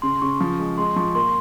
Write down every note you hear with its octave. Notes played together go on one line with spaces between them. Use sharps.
C#3 C6
C#3 C#6
F3 C#6
G#3
G#3 C6
F3 C#6
A#3 C6